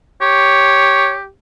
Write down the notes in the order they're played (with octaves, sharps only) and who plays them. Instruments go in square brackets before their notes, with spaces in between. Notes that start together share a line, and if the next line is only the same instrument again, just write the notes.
[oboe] G4 [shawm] C#5